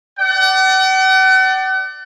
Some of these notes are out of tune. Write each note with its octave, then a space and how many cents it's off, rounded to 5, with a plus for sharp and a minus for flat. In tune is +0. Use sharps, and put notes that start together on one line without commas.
D5 +10 F#5 +40